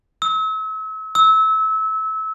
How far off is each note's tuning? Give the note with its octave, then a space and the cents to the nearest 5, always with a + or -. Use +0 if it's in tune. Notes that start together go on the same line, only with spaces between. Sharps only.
E6 -40
E6 -25